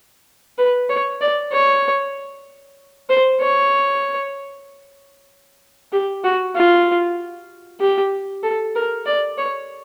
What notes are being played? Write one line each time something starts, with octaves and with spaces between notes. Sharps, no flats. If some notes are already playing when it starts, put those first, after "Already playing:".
B4
C#5
D5
C#5
C5
C#5
G4
F#4
F4
G4
A4
A#4
D5
C#5